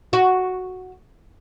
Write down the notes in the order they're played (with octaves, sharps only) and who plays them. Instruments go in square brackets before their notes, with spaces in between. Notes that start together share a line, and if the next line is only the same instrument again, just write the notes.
[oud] F#4